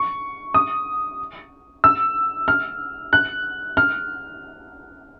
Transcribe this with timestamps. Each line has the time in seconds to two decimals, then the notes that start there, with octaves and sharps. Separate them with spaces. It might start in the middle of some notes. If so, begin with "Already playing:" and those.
Already playing: C#6
0.54 D#6
1.84 E6
2.48 F6
3.13 F#6
3.77 F6